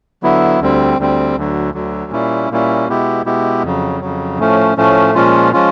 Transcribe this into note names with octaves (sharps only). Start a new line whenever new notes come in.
D3 F#3 B3 E4
D2 D3 G3 C4
D2 D3 G3 C4
D2 D3 F#3
D2 D3 F#3
A#2 G3 A#3 C#4 E4
A#2 G3 A#3 C#4 E4
B2 G#3 B3 E4 G4
B2 G#3 B3 E4 G4
F2 C#3 F#3
F2 C#3 F#3
A2 F3 A3 C#4
A2 F3 A3 C#4
A#2 F3 G#3 C#4 F4
F3 G#3 C#4 F4